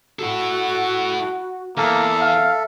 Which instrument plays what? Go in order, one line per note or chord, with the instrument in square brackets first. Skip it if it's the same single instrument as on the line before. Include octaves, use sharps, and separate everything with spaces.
[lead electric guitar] E4 A4 [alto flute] F#4
[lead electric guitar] E2 [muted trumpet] A#3 [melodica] A4 [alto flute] E5
[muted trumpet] F5